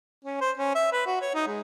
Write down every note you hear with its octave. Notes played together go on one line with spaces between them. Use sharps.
C#4
C5
C#4
E5
B4
F#4
C#5
D#4
G#3